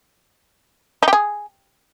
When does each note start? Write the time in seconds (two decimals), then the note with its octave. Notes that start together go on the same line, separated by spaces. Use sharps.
1.03 D#4
1.08 G4
1.13 G#4